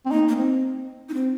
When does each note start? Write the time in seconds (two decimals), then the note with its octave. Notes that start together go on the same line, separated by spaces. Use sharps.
0.06 C4
0.11 A#3 D#4
0.28 A#3
0.37 C4
1.09 D#4
1.14 C4